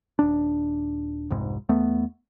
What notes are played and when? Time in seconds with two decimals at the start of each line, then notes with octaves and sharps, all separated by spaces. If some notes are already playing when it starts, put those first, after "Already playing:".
0.19 D#1 D4
1.31 F1 C2 G#2
1.69 E2 A3 B3